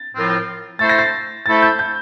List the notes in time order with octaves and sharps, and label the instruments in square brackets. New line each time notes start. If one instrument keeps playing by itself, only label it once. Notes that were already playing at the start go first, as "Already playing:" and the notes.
Already playing: [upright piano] A6
[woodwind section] A2 F3 C4 F4 A#4
[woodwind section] A3 E4 A4 C5 [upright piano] A6
[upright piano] A#6
A6
[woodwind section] A3 E4 A4 C5 [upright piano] A6
[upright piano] G6
G6